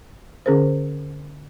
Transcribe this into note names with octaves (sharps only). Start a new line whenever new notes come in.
D3 C#4 G#4 A#4 C5